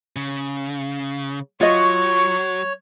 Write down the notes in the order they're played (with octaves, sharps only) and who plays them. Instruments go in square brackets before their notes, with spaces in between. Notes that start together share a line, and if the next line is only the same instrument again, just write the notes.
[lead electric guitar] C#3
[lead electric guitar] F#3 [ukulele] F4 D#5 [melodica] C#5 [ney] C#6